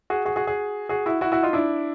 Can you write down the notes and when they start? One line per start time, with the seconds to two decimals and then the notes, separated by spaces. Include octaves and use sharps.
0.10 F#4 G#4
0.25 F#4 G#4
0.36 F#4 G#4
0.47 F#4 G#4
0.89 F#4 G#4
1.06 E4 F#4
1.21 E4 F#4
1.32 E4 F#4
1.43 D#4 F4
1.53 D4 E4